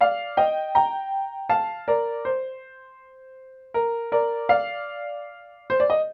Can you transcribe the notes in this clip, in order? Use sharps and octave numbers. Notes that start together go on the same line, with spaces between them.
D5 F5
D#5 G5
G5 A#5
F5 A5
A#4 D5
C5
A#4
A#4 D5
D5 F5
C5
D5
D#5